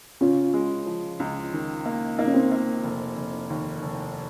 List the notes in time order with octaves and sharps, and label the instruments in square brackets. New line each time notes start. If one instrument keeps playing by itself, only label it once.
[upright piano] C#3 [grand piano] C#4 F4
[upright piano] G#3
F3
C#2
D#3
A#3
[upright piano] A#3 [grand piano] D#4
[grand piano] C#4
C4 D#4
[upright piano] A#3
F1
F1
D#2
F1